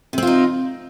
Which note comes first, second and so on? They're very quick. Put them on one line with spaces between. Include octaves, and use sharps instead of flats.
C3 C4 F4 D#4